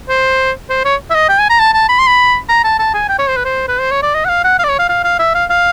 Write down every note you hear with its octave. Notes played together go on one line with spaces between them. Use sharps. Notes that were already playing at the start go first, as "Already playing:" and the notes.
C5
C5
C#5
E5
D#5
G5
G#5
A#5
A5
A5
B5
C6
B5
A#5
A5
A5
G#5
G5
C#5
C5
B4
C5
B4
C5
C#5
D5
D#5
F#5
F5
F#5
F5
D5
C#5
F5
F5
F5
E5
F5
F5